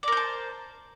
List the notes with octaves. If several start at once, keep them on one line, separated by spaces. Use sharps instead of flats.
A#4 C5 D5 A5